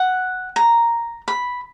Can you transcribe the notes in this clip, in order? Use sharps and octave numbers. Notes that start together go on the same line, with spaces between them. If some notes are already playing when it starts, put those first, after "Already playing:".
Already playing: F#5
A#5
B5